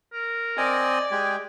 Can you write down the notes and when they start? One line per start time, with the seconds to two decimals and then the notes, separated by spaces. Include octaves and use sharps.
0.13 A#4
0.58 C4 D5 D#5 G#5
1.11 G#3 G4 G#5